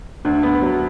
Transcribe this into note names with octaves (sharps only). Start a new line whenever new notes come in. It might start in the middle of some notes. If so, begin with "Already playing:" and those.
D2
B3
F#3